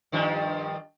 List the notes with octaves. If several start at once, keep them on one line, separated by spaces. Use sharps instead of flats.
G2 D#3 F3